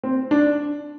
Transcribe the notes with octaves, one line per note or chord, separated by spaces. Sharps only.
C4
D4